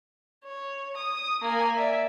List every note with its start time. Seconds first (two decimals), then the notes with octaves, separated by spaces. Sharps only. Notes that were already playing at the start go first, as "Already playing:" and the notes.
0.45 C#5
0.97 D#6
1.42 A#3 G#5
1.76 D5 E5